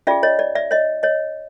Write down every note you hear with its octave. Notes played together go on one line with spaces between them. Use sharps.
C#4 F4 G#4 D5 E5
C#5 D#5
D5
D5 E5
C#5 D#5
C#5 D#5